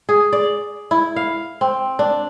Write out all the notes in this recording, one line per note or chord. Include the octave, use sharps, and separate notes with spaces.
G#4
D5
E4
F5
C4
D4